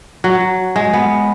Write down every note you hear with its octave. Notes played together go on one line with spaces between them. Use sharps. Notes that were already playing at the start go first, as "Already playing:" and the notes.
F#3
G#3
B3